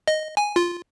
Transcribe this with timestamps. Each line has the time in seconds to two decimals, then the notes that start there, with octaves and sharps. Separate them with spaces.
0.08 D#5
0.37 G#5
0.56 F4